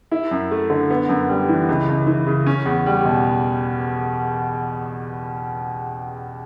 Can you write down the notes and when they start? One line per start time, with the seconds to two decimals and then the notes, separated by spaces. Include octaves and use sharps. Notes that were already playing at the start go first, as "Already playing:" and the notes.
0.12 E4
0.31 F#2
0.51 A3
0.70 D3
0.90 B3
1.09 F#2
1.29 G3
1.49 E3
1.69 C#2
1.88 C#2
2.07 E3
2.26 C#3
2.46 C#4
2.66 E2
2.86 G3
3.05 B2